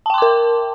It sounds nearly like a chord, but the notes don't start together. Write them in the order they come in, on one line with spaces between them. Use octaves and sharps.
A5 G5 C6 D6 A#4